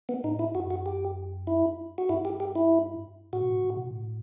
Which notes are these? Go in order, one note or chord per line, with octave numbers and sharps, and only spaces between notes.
B3
A2 D#4
E4
F#2 F#4
F#4
G4
E4
F#4
G2 E4
G4
G4
E4
A2 F#4
B2
A2
A2
B2
A2